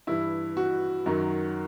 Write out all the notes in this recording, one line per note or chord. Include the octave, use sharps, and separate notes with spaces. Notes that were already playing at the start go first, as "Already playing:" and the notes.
G2 E3 E4
F#4
F#2 D#3 F#3